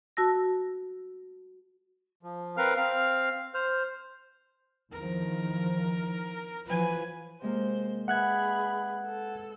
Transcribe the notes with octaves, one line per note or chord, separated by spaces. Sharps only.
F#4 A5 E6 A#6
F3
C4 A#4 B4 F5 F6
C4 F5 F6
C5 F6
E2 D#3 F3 A#4
E3 F3 B4 G#5
C3 G#3 A#3 C5
G#4 B4 E5 F#5 B5 F#6 G#6
A4